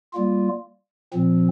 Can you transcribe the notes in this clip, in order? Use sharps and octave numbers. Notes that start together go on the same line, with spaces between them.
G3 A#3 F4
A#2 F3 C4